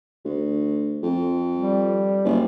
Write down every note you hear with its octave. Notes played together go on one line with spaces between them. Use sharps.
D2
F2
G3
F#1